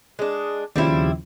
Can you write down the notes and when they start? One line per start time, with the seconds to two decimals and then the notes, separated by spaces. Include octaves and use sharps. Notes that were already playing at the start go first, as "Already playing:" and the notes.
0.19 G#3 D4
0.76 D#2 C#3 F3 G3 C4 E4